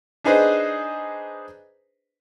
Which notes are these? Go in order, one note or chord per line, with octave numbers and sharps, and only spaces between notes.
D4 D#4 G#4 B4 C5 D#5